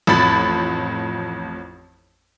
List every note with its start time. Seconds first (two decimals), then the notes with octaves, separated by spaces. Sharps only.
0.07 A1 F2 B5 A6